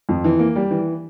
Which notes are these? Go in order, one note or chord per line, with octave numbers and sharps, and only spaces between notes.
F2
E3
A#3
G3
E3